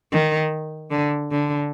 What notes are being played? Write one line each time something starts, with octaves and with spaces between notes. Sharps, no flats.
D#3
D3
D3